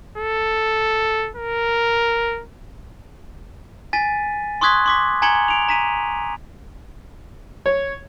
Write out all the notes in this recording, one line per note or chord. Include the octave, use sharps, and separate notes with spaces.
A4
A#4
G#5 A6 B6 D#7
C6 C#6 D#6 F#6 G#6 B6
C6 D6 B6
G#5 A#5 G#6 C#7 F#7 G7
D7 F7
A#5 B6 D#7
C#5